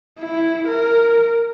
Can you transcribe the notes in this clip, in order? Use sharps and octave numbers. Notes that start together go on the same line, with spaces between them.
E4
A#4